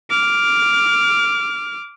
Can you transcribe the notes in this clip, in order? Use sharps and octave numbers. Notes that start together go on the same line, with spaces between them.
D6 F6